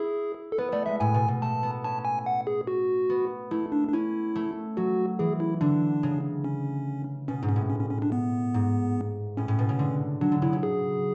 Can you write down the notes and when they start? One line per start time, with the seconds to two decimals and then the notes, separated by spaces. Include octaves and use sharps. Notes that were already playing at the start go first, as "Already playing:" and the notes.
Already playing: E4 G#4
0.52 A4
0.58 B3 B4
0.72 A3 D5
0.86 G#3 E5
1.00 A2 G#5
1.14 B2
1.28 B2
1.42 A3 A5
1.63 B3
1.84 C#4 A5
2.05 G#5
2.26 F#5
2.47 G#4
2.67 F#4
3.10 B3
3.51 A3 E4
3.72 D4
3.89 D4
3.93 C#4 E4
4.36 A3
4.77 F#3 F#4
5.19 E3 G#4
5.40 E4
5.61 D3 D4
6.03 C#3
6.44 C#4
7.28 B2 C#4
7.43 G#2
7.49 C#4
7.56 A2
7.70 C#4
7.80 C#4
7.91 C#4
8.02 D4
8.12 B3
8.54 G#2
9.37 A2 C#4
9.48 A2
9.59 B2
9.69 C#3
9.79 D3
10.21 F#3 D4
10.32 D3
10.42 C#3 E4
10.53 C#3
10.63 G#4